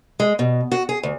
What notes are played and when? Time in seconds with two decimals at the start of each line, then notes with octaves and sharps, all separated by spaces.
0.20 G#3
0.39 B2
0.71 F#4
0.89 G#4
1.03 D2